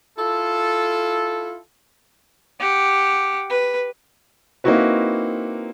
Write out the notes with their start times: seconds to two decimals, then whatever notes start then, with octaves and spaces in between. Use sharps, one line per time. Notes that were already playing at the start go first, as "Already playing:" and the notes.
0.18 E4 F4 A4
2.60 G4 F#5
3.49 B4
4.64 A#3 C4 D#4 E4 F#4 B4